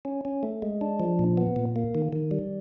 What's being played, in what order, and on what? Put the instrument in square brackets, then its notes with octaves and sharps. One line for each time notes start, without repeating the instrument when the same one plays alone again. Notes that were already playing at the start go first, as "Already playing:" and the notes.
[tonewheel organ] C#4
C#4
A3
G#3
D4
F3
A#2
B3
A#2
A#3
D#3
D#3
G3